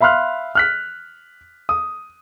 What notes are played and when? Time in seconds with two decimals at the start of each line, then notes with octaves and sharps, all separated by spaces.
0.01 E5 F5 B5 C6 F6 F#6
0.55 F6 F#6 B6
1.69 D#6